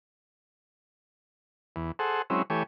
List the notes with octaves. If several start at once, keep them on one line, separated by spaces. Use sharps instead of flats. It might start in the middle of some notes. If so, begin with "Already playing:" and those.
E2
G#4 A4 C5 F#5
F#3 G#3 C4 C#4 E4
E3 A3 G4 C#5 G#5